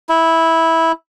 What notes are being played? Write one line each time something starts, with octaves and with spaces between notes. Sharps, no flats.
E4